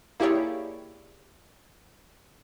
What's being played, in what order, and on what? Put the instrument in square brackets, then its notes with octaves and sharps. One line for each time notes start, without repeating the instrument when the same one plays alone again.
[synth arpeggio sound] A#3 E4 G4 G#4 C#5 D5